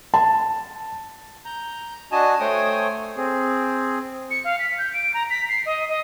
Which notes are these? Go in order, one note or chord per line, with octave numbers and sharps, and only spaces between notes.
A5
A#5 G6
D4 F#4 D#5 G#5 A5
A3 C5 C#5 G5 G#5 D#6
C4 G#4
C#7
F5
B6
G6
D7
A#5
B6
C7
D#5
D#5